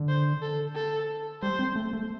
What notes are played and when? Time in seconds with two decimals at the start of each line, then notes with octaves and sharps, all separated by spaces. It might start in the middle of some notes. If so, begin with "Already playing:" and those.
Already playing: D3
0.08 C5
0.42 A4
0.75 A4
1.42 G3 C5
1.59 C4
1.76 A3
1.93 A3